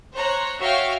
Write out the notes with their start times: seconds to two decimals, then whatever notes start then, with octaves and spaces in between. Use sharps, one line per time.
0.15 C5 C#5 A#5 F#6
0.60 F#4 C#5 E5 F5 G5 F6